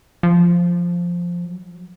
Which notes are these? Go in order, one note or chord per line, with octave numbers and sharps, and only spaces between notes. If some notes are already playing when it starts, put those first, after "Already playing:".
F3
F#3
F3
F#3